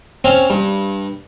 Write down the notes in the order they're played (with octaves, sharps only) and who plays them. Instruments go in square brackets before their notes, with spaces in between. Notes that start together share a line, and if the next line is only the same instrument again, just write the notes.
[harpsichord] C4 C#4 F5
G2